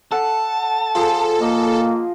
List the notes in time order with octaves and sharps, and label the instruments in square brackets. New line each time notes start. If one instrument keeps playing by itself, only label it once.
[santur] A4 F#5 [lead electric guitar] A5
[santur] F3 G#4 [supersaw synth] A4
[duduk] A#3 [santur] D#5